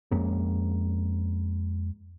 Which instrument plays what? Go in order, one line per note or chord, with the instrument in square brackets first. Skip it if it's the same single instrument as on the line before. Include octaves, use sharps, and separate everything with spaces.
[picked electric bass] F2 G#3 A#3 C#4